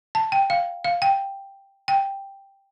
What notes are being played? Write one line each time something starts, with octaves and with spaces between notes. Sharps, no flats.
A5
G5
F5
F5
G5
G5